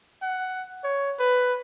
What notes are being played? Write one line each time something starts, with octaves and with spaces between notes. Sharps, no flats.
F#5
C#5
B4